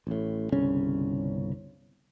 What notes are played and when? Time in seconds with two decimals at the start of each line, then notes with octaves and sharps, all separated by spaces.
0.07 A1 A2
0.52 G1 C2 C#3 C#4